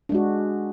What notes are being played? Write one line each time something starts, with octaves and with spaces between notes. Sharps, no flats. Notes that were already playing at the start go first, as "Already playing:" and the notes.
G#3 D4 F#4